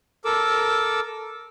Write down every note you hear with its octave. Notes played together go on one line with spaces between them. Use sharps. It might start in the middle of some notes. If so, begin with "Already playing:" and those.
A4 A#4 D6 E6